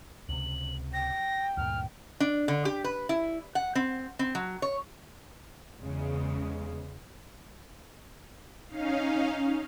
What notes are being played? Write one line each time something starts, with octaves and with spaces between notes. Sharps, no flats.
C#2 C3 F#7
G5 A#6
D2 G2 A#2 F6
D4
D3
G4
B4
E4
F#5
C4
C4
F#3
C#5
E2 C#3 G#3
C#4 D#4 F5